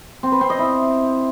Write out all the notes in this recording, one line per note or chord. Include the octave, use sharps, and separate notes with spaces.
C4
B4
C4
D#5
E4